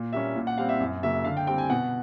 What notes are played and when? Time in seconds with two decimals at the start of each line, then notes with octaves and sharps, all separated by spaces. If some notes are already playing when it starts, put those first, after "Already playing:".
Already playing: A#2
0.13 G3 A#3 C#4 E5
0.36 A#2
0.47 F#5
0.58 G3 C4 F5
0.69 E5
0.80 F#2
1.03 C#3 F#3 A#3 E5
1.25 D3 F5
1.37 G5
1.47 G3 C4 G5
1.58 G#5
1.70 B2 F#5